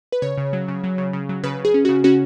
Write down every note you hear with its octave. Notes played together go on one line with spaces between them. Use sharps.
B4
C#3 C#5
C#3
F#3
C#3
F#3
C#3
C#3
F#3
C#3 B4
C#3
G#4
C#4
C#3 F#4
C#4 F#4